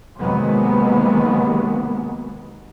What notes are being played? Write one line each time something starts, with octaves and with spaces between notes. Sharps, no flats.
C3 D#3 F#3 G#3 A#3 B3